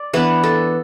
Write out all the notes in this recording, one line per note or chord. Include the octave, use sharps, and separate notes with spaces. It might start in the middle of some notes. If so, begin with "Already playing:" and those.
Already playing: D5
E3 B3 D4 B4
A4